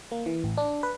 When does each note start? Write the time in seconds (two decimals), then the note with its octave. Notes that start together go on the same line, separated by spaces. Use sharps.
0.12 A#3
0.26 E3
0.44 A1
0.57 D4
0.83 B4